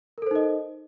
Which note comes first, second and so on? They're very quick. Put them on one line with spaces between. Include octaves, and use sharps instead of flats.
A#4 A4 C5 D#4 D#5